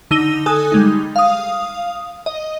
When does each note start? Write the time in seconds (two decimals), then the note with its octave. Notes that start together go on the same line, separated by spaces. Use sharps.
0.11 D3 D#4 E6 A#6 D#7 G7
0.46 A4 G#5 D#6 F#6
0.72 G3 G#3 D#4
1.16 F5 D#6
2.26 D#5